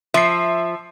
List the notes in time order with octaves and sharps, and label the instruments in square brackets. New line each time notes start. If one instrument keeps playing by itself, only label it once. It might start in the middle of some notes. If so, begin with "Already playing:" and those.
[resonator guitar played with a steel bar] F3 [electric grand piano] E5 C7